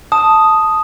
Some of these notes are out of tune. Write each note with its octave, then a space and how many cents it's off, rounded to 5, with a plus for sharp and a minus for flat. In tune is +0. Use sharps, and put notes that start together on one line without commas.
A5 +0 D#6 +0